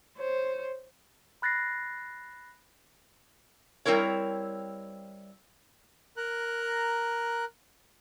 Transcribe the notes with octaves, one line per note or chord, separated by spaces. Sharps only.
C5 C#5
B5 F#6 A6 A#6 C7
G3 C4 E4 A#4 C#5
A#4 A#5 F#6